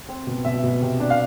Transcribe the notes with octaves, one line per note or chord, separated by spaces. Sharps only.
C4
B2
B2 E5
B2
C3
D4
F5